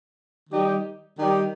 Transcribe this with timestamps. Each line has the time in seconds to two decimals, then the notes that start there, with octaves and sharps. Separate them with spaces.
0.50 D#3 G3 D#4 G4
1.18 D#3 G3 D#4 G4